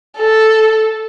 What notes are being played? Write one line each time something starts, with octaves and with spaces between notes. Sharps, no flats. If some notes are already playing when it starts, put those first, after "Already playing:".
A4